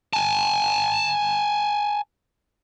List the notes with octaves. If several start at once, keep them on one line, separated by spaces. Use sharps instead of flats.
G#5 A5